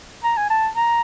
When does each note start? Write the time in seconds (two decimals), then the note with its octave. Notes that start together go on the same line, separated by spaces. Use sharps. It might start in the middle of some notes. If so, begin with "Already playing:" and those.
0.24 A#5
0.37 G#5
0.50 A5
0.75 A#5